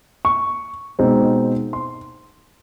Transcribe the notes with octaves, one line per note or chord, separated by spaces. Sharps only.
C#6
B2 G#3 C4 D#4
C6